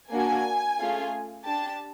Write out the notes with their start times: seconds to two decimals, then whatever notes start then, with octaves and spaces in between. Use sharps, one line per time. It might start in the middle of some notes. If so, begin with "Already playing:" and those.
0.11 A#3 D4 F#4 G#5
0.79 A3 C#4 F4 G#4
1.45 D4 G4 A5